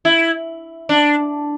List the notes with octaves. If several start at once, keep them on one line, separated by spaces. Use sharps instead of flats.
E4
D4